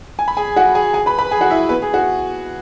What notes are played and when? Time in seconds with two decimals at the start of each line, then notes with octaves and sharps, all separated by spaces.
0.19 G#5
0.28 B5
0.37 G#4 G#5
0.56 F#4 F#5
0.75 G#4 G#5
0.94 G#4 G#5
1.06 B4 B5
1.19 B4 B5
1.31 G#4 G#5
1.41 F#4 F#5
1.50 E4 E5
1.69 B3 B4
1.82 G#4
1.94 F#4